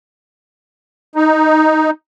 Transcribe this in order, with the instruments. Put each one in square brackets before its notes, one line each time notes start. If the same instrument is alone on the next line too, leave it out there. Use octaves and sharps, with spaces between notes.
[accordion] D#4